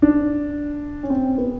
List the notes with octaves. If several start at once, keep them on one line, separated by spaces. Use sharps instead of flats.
D4
C#4
C4
B3